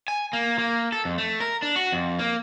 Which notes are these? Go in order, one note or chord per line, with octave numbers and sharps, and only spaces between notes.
G#5
A#3
A#3
A4
F2
A3
A#4
D4
F#4
F2
A#3